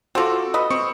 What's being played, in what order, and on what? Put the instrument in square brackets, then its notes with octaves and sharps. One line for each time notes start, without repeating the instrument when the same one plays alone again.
[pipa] C4 F4 [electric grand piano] F#4 A4 D6
[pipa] B4 D#5
[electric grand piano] C4 C#6 C#7